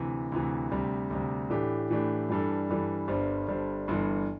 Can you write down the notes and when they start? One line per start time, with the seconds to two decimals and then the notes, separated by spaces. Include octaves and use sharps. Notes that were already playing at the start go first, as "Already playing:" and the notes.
Already playing: D2 C3 E3
0.32 D2 C3 E3
0.72 D2 C3 G3
1.10 D2 C3 G3
1.50 A2 E3 A3 D4 G4
1.90 A2 E3 A3 D4 G4
2.29 G2 E3 G3 D4 A4
2.69 G2 E3 G3 D4 A4
3.08 G1 G2 G3 D4 C5
3.48 G1 G2 G3 D4 C5
3.88 G1 G2 E3